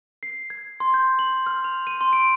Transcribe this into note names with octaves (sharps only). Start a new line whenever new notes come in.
C7
G#6
C6
G6
F#7
F6
F7
D#7
C6
D7